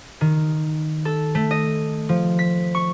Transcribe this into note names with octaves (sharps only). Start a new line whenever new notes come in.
D#3
A4
A3
D#5
F3
B6
C#6